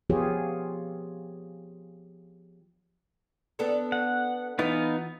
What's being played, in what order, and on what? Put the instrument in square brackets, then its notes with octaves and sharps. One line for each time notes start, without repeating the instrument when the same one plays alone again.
[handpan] F3 B3 F4 G4 G#4 C#5
[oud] B3 D4 A4
[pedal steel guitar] F#5
[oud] E3 [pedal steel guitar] B3 D#4 F4